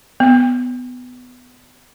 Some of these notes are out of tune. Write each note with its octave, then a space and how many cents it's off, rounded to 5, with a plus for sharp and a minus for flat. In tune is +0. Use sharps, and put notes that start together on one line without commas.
B3 +15